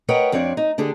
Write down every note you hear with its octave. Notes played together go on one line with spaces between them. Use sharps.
A#4 B4 C#5 D#5 F#5 G5
F2 C4 D4 C#5 D5
D#4
D3 D4 G4 G#4